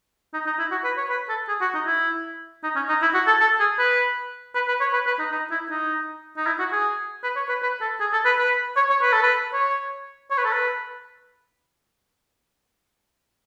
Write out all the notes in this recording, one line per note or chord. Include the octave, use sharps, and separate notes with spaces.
D#4
D#4
E4
F#4
B4
C#5
B4
A4
G#4
F#4
D#4
E4
D#4
C#4
D#4
E4
F#4
A4
A4
G#4
B4
B4
B4
C#5
B4
B4
D#4
D#4
E4
D#4
D#4
E4
F#4
G#4
B4
C#5
B4
B4
A4
G#4
A4
B4
B4
C#5
C#5
B4
A4
B4
C#5
C#5
B4
A4
B4